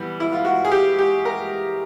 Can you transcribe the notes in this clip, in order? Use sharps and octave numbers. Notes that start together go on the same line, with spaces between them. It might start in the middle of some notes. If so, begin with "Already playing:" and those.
Already playing: E3 G3 B3
E4
F4
F#4
G#4
G4
G4
A#4